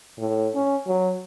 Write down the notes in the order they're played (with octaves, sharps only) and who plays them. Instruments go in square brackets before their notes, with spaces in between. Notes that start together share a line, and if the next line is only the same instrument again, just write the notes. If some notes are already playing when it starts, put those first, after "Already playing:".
[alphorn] A2
C#4
F#3